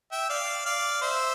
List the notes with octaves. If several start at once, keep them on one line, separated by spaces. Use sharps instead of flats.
E5 G5
D5 F5
D5 F5
C5 E5